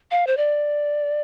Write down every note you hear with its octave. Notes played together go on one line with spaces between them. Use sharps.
F5
C5
D5